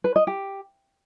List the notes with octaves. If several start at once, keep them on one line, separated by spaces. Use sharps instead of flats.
B4
D#5
G4